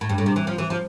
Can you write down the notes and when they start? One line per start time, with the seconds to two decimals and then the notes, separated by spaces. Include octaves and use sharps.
0.01 A2
0.09 G2
0.18 A2
0.26 C3
0.36 E3
0.47 F3
0.58 E3
0.70 F3